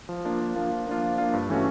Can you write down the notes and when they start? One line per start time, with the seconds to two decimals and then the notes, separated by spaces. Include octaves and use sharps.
0.09 F3
0.25 A#3 D4 F4
0.41 F3
0.56 A#3 D4 F4
0.71 F3
0.87 A#3 D4 F4
1.03 F3
1.18 A#3 D4 F4
1.33 G2
1.49 E3 A3 C#4 F#4